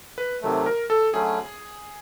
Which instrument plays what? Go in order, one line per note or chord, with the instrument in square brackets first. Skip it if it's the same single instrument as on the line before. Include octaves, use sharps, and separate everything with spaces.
[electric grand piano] B4
[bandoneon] C3 D#3 F#3 A3
[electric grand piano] A#4
A4
[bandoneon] D3 F#3 A3 C#4 [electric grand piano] G#4